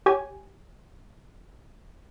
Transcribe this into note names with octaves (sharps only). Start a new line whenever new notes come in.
G4 C#5 G#5